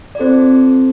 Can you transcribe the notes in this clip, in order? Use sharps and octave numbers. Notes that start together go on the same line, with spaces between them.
D5
C4 F4 A4 C5